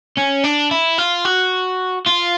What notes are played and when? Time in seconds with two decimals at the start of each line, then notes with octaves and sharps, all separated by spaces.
0.17 C#4
0.44 D4
0.71 E4
0.98 F4
1.25 F#4
2.06 F4